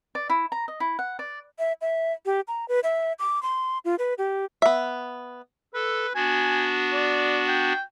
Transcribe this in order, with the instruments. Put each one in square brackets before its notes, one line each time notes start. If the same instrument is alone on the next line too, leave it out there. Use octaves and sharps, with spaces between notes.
[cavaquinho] D5
E4
A#5
D#5
E4
F#5
D5
[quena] E5
E5
G4
A#5
B4
E5
D6
C6
F4
B4
G4
[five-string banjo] B3 E5
[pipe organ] A4 [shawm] B4
[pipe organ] B3 D4 F#4 [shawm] G#5
[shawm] D5
G5